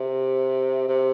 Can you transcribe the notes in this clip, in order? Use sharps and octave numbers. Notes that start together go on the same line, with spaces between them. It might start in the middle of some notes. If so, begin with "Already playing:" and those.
Already playing: C3
C3